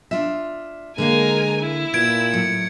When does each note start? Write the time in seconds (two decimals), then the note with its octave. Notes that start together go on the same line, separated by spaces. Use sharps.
0.11 D4 F4 E5
0.98 D3 G#3 A#3 A#4 F5 G#5
1.60 E4
1.94 A#2 B4 G#6 D7
2.33 A2 F#3 C#7